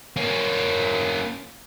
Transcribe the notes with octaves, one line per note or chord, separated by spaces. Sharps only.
A#3 C#4